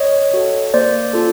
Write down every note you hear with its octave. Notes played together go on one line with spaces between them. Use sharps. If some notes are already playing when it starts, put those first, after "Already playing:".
Already playing: C#5 D#5
F#4 A4
A#3 C5 D5
C#4 F4 A4